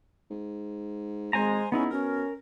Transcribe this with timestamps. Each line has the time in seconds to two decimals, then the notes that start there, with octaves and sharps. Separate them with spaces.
0.31 G#2
1.33 G#1 G#3 C5 G#5 A#5
1.72 C#3 B3 C#4 D#4 E4
1.91 B2 C#4 A#4